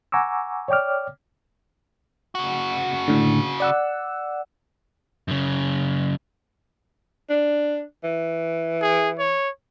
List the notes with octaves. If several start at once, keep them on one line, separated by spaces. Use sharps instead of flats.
F#5 G#5 A#5 C#6 D6 E6
C#5 D5 G5 D6 F6
C#3 F#4
A2 D3
D5 F#5 E6
F#2 C#3
D4
E3
G#4
C#5